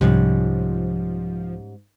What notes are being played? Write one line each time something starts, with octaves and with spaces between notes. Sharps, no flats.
C2 G#2 F3 G3 C#4